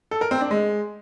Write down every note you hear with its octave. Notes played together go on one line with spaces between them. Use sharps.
A4
A#4
C4
D4
G#3